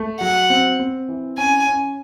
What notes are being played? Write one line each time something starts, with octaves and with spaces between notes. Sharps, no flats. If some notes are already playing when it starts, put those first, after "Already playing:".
Already playing: A3
F#3 F#5
C4
C4
E3
C#4 G#5
C#4